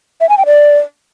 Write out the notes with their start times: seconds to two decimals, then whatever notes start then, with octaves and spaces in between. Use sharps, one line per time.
0.21 E5
0.29 G#5
0.38 G5
0.46 D5